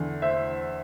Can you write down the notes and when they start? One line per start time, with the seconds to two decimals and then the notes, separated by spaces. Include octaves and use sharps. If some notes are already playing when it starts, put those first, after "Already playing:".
Already playing: E2 D3
0.22 C5 E5